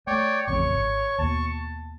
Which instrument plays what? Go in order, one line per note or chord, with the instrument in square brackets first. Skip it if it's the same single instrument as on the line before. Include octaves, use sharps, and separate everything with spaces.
[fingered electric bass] A3 [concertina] C#5 D5 G5
[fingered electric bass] A1 F2 C#3 [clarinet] C#5 [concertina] C#6
[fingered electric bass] D#1 G#1
[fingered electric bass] D#2 B2 [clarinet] A5